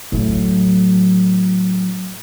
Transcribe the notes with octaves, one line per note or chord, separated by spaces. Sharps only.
A2 F#3